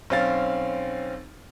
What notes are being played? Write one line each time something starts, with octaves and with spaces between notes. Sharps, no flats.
B1 C4 C#4 F5 A6